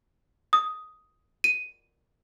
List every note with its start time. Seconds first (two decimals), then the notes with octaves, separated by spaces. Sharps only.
0.53 D#6
1.44 D#7